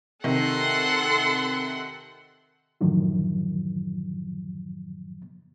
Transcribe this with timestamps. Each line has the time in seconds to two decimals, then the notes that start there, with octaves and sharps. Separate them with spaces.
0.24 C3 D#3 A4 F#5 C6
2.81 F#2 A2 D3 D#3 F3 F#3